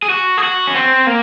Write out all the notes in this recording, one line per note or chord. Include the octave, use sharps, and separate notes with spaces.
G#4
F#4
G#4
F#4
C#4
C4
A#3